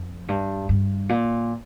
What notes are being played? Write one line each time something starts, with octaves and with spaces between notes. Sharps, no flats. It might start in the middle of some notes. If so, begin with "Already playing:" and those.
Already playing: F2
G2
G2
A#2